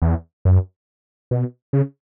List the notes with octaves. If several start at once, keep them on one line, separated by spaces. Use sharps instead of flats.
E2
F#2
B2
C#3